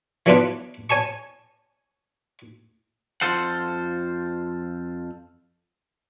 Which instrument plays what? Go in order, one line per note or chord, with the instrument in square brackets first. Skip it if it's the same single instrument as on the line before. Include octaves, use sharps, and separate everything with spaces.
[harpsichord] E3 F#3 B3 D4 F4 B4
C#5 G#5 A5 C#6
[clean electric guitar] F2 D#3 F4 A4 C5 F#5